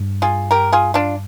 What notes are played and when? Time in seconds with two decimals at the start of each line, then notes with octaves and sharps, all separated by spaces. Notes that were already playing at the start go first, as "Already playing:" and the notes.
Already playing: G2
0.22 F4 G#4
0.51 G4 A#4
0.73 F4 G#4
0.94 D4 F4